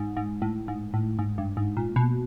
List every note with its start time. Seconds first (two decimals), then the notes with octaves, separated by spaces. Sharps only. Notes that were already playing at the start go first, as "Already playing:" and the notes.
Already playing: G#2
0.17 G#2
0.42 A2
0.68 G#2
0.94 A2
1.19 G#2
1.38 G2
1.57 G#2
1.77 A#2
1.96 B2